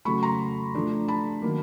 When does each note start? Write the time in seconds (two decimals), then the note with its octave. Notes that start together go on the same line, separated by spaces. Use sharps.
0.05 C#3 F#3 A3 B5 C#6
0.23 A#5 C6
0.75 F3 A3 D4
1.08 A5 B5
1.42 D#3 F#3 A#3